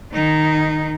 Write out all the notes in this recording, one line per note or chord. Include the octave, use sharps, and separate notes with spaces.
D#3 D#4